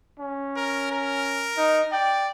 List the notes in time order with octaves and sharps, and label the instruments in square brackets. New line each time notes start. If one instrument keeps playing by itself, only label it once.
[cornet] C#4
[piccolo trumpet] A#4
A#4
[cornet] D#4
[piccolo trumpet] D5 [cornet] G5